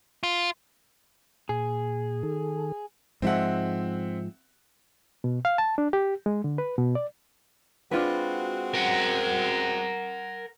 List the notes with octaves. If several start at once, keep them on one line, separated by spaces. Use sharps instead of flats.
F4
A#2 G#4
D#3 A4
G#2 F3 G#3 C4 E5 F#5
B2
F5
A5
D4
G4
G#3
D3
B4
B2
D5
G#3 C4 D4 F4 F#4 B4
A#4 F#5